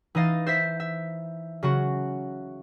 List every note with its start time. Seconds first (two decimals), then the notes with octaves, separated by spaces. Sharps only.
0.15 E3 D#4 D#5 F5 A6
0.47 C5 E5 B6
0.80 E5
1.63 C#3 F#3 F#4